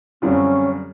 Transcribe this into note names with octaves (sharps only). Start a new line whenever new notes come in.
F#2 D3 G3 C4 C#4 F4